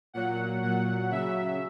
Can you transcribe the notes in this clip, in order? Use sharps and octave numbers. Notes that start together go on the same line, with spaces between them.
A#2 F#3 F#5
A#2 F#3 F#5
C#3 F#3 E5